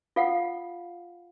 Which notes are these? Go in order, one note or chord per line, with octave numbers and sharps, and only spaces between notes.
F4 F5 F#5